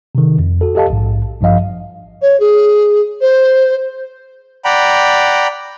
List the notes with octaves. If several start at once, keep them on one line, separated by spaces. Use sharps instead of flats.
C3 D#3
F2
F#4 A4
G4 A4 D#5 F5 A5
A#1 G#2
A1 G2 F3 D#5 F5
C#5
G#4
C5
D5 F#5 G5 A#5 B5